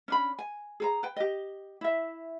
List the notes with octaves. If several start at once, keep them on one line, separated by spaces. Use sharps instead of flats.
C#4 D4 B5
G#5
G#4 A4 A#5
B4 G5
G4 D#5
E4 E5